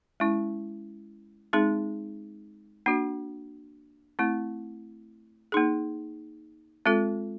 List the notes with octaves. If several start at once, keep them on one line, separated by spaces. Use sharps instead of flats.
G#3 C#4 E4
G#3 C4 D#4 G#4
A#3 D4 F#4
A3 C4 E4
A#3 D#4 G#4
G#3 C4 F4 A4